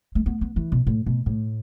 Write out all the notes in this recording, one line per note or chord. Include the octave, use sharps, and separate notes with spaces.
A3
B3
B3
E3
B2
A2
B2
A2